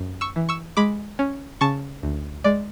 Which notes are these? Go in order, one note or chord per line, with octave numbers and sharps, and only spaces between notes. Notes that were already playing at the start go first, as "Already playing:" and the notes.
Already playing: F#2
C#6 E6
E3
C#6 E6
G#3 B5 D6
C#4
C#3 A5 C#6
D2
G#3 D5